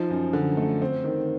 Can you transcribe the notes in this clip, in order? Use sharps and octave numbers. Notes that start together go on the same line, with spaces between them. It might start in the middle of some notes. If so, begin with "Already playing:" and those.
Already playing: F3 D#4
F#2
D3
A3
C4
D#3